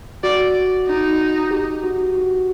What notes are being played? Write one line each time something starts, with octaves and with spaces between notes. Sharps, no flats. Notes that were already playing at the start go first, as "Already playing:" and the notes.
F#4 D5
D#4
G4
F#4
F#4